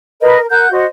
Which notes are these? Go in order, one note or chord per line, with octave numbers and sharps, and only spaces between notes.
A#4 B4 D#5
A#4
A#4 F#5 F#6 G6
F#4 C5 D#5